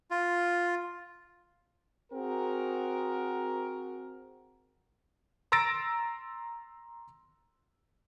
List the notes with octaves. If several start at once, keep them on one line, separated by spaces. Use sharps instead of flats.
F4
C4 F#4 G#4 A#4
A#5 C6 E6 A6 A#6 D7